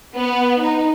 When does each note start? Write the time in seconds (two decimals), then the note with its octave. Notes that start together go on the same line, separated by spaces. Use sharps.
0.14 B3
0.61 D#4